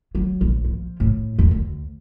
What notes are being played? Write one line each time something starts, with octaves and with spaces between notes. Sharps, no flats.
F#3
A#1
F3
A2
E2
D2